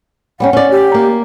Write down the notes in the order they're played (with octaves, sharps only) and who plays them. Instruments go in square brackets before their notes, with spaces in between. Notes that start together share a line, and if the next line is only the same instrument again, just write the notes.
[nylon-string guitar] G3 B3 C#4 [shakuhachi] F#5
[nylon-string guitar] C#4 D5
[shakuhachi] G4
[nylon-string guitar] A#3